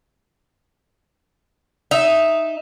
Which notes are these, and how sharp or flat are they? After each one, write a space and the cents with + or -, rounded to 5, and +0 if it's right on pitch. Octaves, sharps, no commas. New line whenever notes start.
D#4 +0 E5 +0